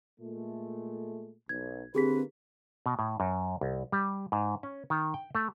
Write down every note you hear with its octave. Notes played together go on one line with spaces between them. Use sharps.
A#2 G#3 A3
B1 G#6
D3 A#3 C4 G4 G#4 B4 B6
B2
A2
F#2
C2
G3
G#2
C#4
D#3
G5
A3